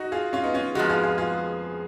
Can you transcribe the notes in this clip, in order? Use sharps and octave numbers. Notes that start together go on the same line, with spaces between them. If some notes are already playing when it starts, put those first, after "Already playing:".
Already playing: D#4 F#4
F4 G#4
C#4 F4
B3 D#4
C#4 F4
F2 F3 G#3 B3 D#4 F#4
F4 G#4
F4 G#4
F4 G#4